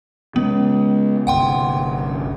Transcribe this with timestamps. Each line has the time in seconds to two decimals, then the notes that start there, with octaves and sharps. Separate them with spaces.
0.36 C#3 G#3 B3
1.27 G1 C2 F#5 G5 C6